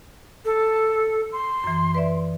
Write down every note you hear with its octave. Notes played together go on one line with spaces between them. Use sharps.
A4
C6
F#2 E3
B4 D5 E5